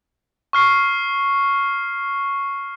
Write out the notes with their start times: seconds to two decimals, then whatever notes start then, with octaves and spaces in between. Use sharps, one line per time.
0.53 C#6 F6 C7